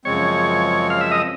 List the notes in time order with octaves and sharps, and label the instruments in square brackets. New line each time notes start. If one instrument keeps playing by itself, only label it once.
[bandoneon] F#2 C#3 F3 G#3 C4 [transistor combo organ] C#5
[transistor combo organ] F5
E5
D#5